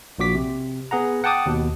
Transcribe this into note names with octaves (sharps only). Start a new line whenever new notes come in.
A#1 A#2 F#4 D6 B6
C3
B3 G#4 F#5 A#5
F#5 G5 A5 D6 D#6
D#2 B2